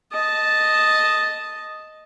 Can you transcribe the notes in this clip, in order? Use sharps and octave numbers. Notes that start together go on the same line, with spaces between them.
D#5 A5